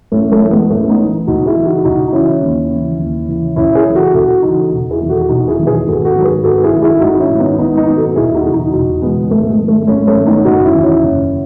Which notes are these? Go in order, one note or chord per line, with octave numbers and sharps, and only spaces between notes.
A1 A3 C#4
A3
A2 E3
G#3 B3
A1 A3 C#4
B3 D#4
A2 E3
C#2 D#4 F#4
E4 G#4
C#3 E3
D#4 F#4
C#2 D#4 F#4
D#4
C#3 E3 C#4 E4
D#2
C#3
E3
D#2
C#3 E3
C#2 C#4 E4
E4 G#4
C#3 E3
F#4 A4
C#2 F#4 A4
C#3 E3 D#4 F#4
E1
E4 G#4
E2 D#3
F#4 A4
E1 D#4 F#4
E4 G#4
E2 D#3
G#4 B4
G#1 F#4 A4
F#4 A4
G#2 D#3
G#4 B4
G#1 F#4 A4
E4 G#4
G#2 D#3
E4 G#4
G#1 D#4 F#4
C#4 E4
G#2 D#3
B3 D#4
G#1 B3 D#4
B3 D#4
G#2 D#3
F#4 A4
E1 E4 G#4
D#4 F#4
E2 C#3
D#4 F#4
E1 D#4 F#4
E2 C#3 G#3 B3
G#1 A3
G#3
G#2 D#3
A3
G#1 A3 C#4
A3 C#4
G#2 D#3
B3 D#4
F#1 D#4 F#4
C#4 E4
E2 D#3
C#4 E4
F#1